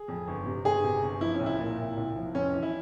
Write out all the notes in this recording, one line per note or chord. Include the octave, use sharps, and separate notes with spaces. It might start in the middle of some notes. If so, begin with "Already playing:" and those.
Already playing: G#4
F2
G1
C3
G1 G#4
C3
G1
F3 E4
C#4
C2
E4
A#2
C2
C2
F3
F1 C#4
E3
E4